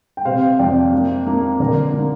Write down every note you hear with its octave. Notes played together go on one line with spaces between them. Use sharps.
G5
C3 C5 F5
F2 D5 G5
A#3
A#3
D3 A#4 D5
A#3